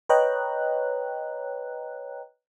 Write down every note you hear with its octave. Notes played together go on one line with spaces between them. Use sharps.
B4 C#5 D#5 G5 A#5 F#6